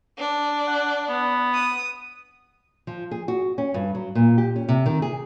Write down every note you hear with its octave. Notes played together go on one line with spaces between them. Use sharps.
D4
F#5
B3
D#6
F3
G#4
F#4
C#4
G2
F#3
A#2
G4
C#4
C3
D#3
G#4